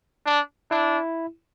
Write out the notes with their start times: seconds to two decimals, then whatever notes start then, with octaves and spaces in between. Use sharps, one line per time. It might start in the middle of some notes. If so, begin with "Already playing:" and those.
0.26 D4
0.71 D4 E4